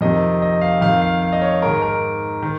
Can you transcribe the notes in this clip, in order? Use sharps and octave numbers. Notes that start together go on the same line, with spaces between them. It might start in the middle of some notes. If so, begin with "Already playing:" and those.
F2 C3 D#3 D#5
D#5
F5
F2 D#3 F5
F5
F5
D#5
C#5
G#2 D#3 A#4
A#4
D#3